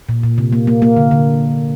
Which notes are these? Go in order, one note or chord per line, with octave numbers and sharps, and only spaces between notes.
A#2
A#2
C3
A#3
A#3
A#3
D3
D3